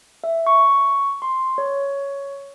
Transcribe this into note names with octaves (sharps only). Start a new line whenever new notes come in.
E5
C#6
C6
C#5